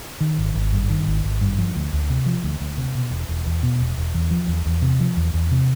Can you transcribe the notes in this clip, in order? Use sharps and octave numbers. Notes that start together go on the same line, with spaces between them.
D#3
G#1
G#1
G2
D#3
G#1
G#1
G2
F3
D2
D2
C3
F3
D2
D2
C3
B2
E1
E1
E2
B2
E1
E1
E2
F3
E2
E2
C3
F3
E2
E2
C3